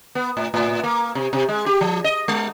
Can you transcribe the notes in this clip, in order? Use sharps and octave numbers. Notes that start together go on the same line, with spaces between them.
B3
A2
A2
A#3
C3
C3
G#3
G4
F3
D#5
G#3